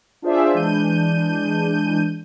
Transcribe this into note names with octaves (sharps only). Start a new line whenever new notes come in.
D4 F4 G#4 C5 D5 E5
E3 G#3 D4 G6 D#7